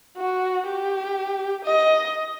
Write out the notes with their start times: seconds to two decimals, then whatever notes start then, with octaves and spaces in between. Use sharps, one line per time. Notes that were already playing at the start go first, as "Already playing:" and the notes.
0.17 F#4
0.67 G4
1.64 D#5